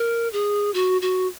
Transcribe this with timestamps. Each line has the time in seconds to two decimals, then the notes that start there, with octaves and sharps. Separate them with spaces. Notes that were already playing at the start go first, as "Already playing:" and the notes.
Already playing: A#4
0.33 G#4
0.74 F#4
1.02 F#4